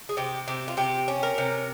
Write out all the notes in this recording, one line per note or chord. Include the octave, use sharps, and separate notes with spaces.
G#4
C3 G4
C3 G4
F4
C3 G4
C#4
A#4
C3